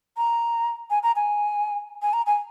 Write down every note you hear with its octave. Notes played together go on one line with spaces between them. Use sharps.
A#5
G#5
A#5
G#5
G#5
A#5
G#5